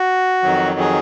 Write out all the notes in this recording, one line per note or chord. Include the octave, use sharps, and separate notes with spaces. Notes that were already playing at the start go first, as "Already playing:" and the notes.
Already playing: F#4
F2 D#3 F#3
G#4